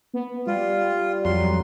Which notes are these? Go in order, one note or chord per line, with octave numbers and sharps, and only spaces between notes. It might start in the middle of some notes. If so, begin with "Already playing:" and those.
B3
G3 F4
F2 F#3 C6